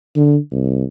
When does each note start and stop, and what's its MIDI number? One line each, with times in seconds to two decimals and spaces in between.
0.16 0.37 50
0.51 0.84 36